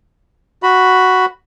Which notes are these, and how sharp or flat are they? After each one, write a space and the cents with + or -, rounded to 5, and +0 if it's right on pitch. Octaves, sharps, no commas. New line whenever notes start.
F#4 +0 B5 +0